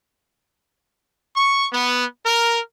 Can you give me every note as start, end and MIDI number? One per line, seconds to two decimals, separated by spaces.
1.35 1.66 85
1.73 2.05 59
2.25 2.60 70